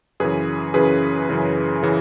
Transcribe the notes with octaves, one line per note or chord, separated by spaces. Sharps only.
F#2 C#3 E3 G#4 B4
F#2 C#3 E3 G#4 B4
F#2 C#3 E3
C#3 E3